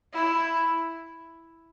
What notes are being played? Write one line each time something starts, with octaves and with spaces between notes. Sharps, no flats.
E4